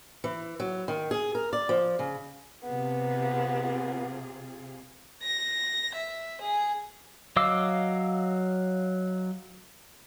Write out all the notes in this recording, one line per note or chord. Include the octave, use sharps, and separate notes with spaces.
E3
F#3
D#3
G#4
A#4
D5
F3
C#3
C3 B3 F4 G#4
A#6
E5
G#4
F#3 D#5 F5 D6 E6